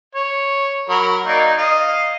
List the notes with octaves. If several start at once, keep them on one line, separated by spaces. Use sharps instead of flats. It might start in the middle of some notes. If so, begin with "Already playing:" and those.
C#5
F#3 A#4 B5
A#3 D#4 D5
D#5 F5